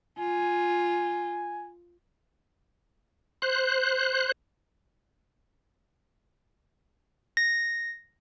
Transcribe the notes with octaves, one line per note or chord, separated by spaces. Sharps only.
F4 G#5
C5 F#6
A#6